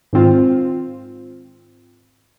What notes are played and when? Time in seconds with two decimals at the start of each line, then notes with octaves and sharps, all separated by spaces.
0.13 G#2 D#3 C4 F4